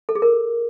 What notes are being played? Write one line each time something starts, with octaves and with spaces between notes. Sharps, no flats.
A4
G#4
A#4